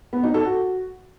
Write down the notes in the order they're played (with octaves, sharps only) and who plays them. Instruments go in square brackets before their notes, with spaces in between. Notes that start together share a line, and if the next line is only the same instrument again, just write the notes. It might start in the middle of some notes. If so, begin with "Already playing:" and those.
[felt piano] B3
D#4
A4
F#4